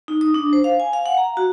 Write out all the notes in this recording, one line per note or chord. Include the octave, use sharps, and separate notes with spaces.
D#4
D#6
D4
C5
F5
G#5
F5
F#5
A#5
F#4